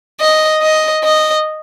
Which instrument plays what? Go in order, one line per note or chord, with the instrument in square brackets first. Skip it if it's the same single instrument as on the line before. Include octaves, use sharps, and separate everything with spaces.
[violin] D#5
D#5
D#5